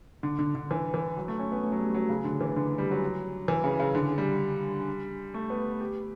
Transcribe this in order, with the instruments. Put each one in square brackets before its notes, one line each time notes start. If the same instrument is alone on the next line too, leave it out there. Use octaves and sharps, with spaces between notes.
[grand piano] D3
D3
D3
E3
E3
F#3
A3
C#4
B3
A3
F#3
G3
F#3
C#3
D3
E3
D3
G3
F#3
E3
C#3
C#3
D3
G3
A3
B3
G4